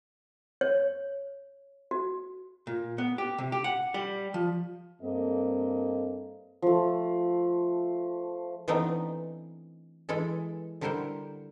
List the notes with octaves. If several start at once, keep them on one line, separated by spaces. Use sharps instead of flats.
C#5
F#4
A#2
B3
G4
C3
G4
F#5
G3
F3
G2 A#3 C4 A4 D#5
F3 A3
E3 A3 B3 C4 D4 D#4
E3 G#3 E4 A4
D3 G3 E4 A#4 C5 F#5